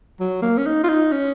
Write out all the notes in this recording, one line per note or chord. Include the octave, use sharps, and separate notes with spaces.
F#3
A#3
C#4
D#4
F4
D#4
C#4